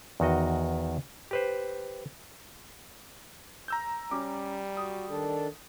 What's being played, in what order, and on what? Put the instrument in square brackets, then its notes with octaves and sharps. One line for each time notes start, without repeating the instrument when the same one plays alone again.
[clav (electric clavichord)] E2 D#3 F#4 D#5
G4 B4 C5
[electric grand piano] A#5 E6 G6
[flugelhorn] G3 [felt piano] C#4 D6
[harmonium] F#4 [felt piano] D#6
[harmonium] D#3 D4 A4